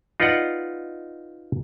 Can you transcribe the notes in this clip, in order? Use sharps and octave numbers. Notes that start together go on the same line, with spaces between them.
D#4 F4 B4 D5 D#5 F#5